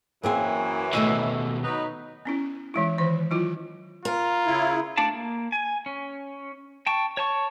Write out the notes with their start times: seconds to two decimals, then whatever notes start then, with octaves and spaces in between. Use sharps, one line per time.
0.23 F#2 E3 A#3 C4 G#4
0.93 D#2 B2 A3 D#5 E5
1.64 F#3 D#4 B4
2.25 B3 C#4 E4
2.74 E3 G#3 E4
2.98 D#3 E3 C5
3.31 F#3 E4 F4
4.05 F4 A#4
4.47 C#3 E4
4.97 A3 D4 D5 F5 A5
5.13 A#3
5.52 G#5
5.86 C#4
6.87 G5 A5 C#6
7.17 C#5 A5 C#6